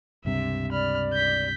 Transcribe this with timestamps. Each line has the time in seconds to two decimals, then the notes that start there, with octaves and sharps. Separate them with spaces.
0.25 C#2 G2 C3 E5
0.72 D5 B5 F6
1.13 G6 B6